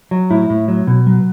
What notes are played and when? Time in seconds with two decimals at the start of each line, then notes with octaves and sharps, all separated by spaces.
0.11 F#3
0.30 A2 E4
0.50 A2
0.68 F#3
0.87 B2
1.07 F#3